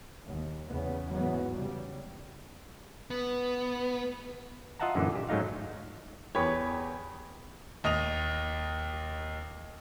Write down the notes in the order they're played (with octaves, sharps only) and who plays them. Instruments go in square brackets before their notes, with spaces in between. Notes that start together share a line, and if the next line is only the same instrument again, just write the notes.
[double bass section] D#2
E2 C#3 B3
E2 G#2 E3 F#3 B3
C#3 G3
[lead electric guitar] B3
[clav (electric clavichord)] F4 D#5 E5 F#5 A5 A#5
F#2 A#2 D3 E3
G4
G#2 F#3 A3 D#4 F5
[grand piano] E2 C#5 [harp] G4 G#4 B4
[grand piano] D#2 D#5 D#6 F7